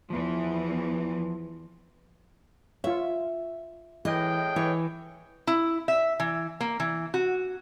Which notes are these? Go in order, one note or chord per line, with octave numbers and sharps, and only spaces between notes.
E2 E3 F3
F4 C#5 E5
A2 E3 G#3 D#5 G5
E3 C#5
E4
E5
E3
A#3
E3
F#4